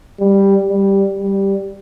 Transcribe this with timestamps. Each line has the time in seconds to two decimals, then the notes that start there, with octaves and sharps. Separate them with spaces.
0.20 G3
0.70 G3
1.19 G3